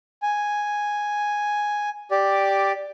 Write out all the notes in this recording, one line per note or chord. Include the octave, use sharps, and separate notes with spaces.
G#5
G4 D5